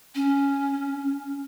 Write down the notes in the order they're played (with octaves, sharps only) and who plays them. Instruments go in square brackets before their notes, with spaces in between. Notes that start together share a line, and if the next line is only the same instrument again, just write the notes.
[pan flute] C#4